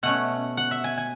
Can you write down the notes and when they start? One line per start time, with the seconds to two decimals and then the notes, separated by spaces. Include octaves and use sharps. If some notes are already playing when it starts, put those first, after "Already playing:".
0.03 B2 A3 C#4 F#5
0.57 F#5
0.71 E5
0.84 G#5
0.98 G#5